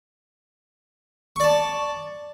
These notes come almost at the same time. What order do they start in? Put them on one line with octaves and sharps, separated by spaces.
C#6 D5 A5